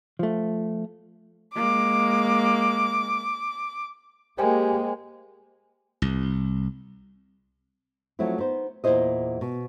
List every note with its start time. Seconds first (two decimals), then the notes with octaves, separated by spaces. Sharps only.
0.19 F3 A3
1.56 G#3 A#3 D6
4.38 G#3 A#3 G4 C5 G5 G#5
6.02 C2
8.19 F3 F#3 A3 C4 E4
8.38 B3 D#4 C5
8.84 E2 A#2 F3 E4 C5 D#5
9.41 B2